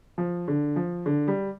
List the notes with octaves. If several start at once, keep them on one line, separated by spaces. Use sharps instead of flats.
F3
D3
F3
D3
G3